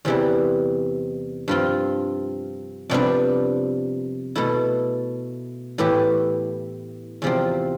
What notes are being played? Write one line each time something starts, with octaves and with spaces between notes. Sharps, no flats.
E2 C3 E3 G3
G2 F3 C4 F4
F2 C3 G3 B3 D4
B2 A3 E4
A2 E3 B3 E4 G4
E2 C3 F3 C4